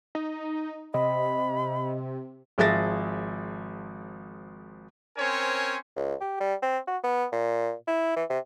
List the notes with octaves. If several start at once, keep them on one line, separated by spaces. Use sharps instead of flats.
D#4
C3 D#5 B5
G#1 F3 G#4 E5 A6 A#6
C4 C#4 A#4 C5 C#5 G#5
C#2
G4
G3
C4
F#4
B3
A#2
E4
E3
C3